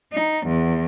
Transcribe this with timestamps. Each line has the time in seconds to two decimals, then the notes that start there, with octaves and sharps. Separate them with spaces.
0.13 D#4
0.47 E2